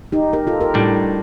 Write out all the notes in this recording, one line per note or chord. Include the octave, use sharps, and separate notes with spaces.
D#4 G4
G4 A#4
F4 A4
G4 A#4
A2 G3 D4